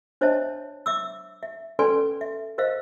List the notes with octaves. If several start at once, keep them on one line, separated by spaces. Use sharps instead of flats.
D4 C5 C#5 D#5 E5 A5
E5 D6 E6
E5
C#4 A4 B4 D5 G#5 C6
E5
A#4 C5 D#5 F5